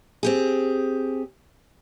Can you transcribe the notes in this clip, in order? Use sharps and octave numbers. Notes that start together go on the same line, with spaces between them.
C4 G4 G#4